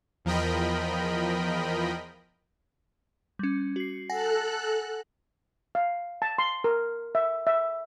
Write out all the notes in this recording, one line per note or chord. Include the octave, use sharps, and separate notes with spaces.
E2 F3 A#4 D#5 G5 B5
G3 C#4
F#4 C7
A4 F#5 G#5 F#6 A#6
F5
A5
C6
A#4
E5
E5